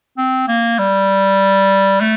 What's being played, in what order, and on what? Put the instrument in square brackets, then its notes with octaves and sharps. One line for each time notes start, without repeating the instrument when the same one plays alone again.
[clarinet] C4
A#3
G3
A3